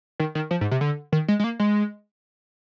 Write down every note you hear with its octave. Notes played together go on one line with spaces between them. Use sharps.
D#3
D#3
F3
G#2
C3
D3
D#3
G#3
G#3
A#3
G#3